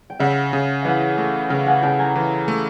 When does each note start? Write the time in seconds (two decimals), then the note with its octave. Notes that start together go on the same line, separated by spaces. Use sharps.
0.10 G5
0.19 C#3 E5 F#5
0.53 C#3
0.85 E3 E5 F#5
1.18 A3
1.50 C#3 F5 G5
1.66 F#5 G#5
1.83 C#3 G5 A5
1.99 G#5 A#5
2.16 E3
2.48 A3